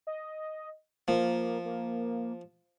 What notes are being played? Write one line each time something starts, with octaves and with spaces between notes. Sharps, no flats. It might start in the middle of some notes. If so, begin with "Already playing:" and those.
D#5
F3 A#3
A#3